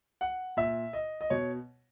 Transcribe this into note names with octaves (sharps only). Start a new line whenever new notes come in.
F#5
A#2 E5
D#5
D#5
B2 C#5